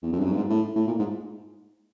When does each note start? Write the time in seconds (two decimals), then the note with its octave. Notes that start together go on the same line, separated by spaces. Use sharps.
0.02 E2
0.13 F2
0.19 G2
0.24 F#2
0.32 G2
0.36 G#2
0.50 A2
0.75 A2
0.87 A#2
0.99 G#2